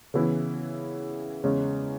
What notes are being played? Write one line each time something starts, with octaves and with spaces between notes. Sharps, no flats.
C#3 E3 B3 E4
E2 C#3 G#3 C#4